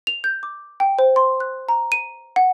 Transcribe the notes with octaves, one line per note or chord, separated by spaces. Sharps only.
F7
G6
D6
G5
C5
C6
F#6
A#5
D#7
F#5